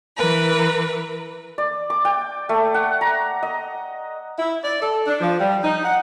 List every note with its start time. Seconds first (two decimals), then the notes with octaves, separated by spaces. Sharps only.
0.16 E3 A#4 B4
1.58 D5
1.90 D6
2.05 G5
2.49 A3
2.74 F#5
3.01 A#5
3.43 D#5
4.37 E4
4.64 D5
4.81 A4
5.07 D4
5.20 F3
5.39 G3
5.64 D#4
5.83 F#5